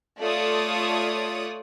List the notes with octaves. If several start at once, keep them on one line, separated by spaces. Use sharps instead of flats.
A3 F4 A4 C#5 D5 D#6